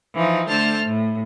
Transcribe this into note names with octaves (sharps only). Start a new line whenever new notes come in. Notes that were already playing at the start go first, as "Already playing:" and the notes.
E3 F3 D#4
D3 A3 C5 A5 F6
A2